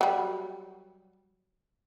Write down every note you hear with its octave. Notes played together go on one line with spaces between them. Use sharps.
F#3 G3